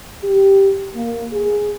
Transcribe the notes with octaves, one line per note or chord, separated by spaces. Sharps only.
G4
A#3
G#4